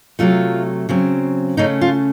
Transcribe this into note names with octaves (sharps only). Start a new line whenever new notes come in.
C3 F#3 A3 F4
C#3 F#3 C4
C#3 A3 C#4 D#4
F4